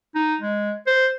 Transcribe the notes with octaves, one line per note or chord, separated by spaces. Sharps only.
D#4
G#3
C5